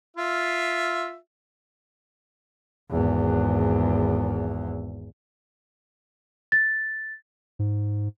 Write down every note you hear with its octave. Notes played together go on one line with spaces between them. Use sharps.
F4 E5
G#1 E2
A6
G#2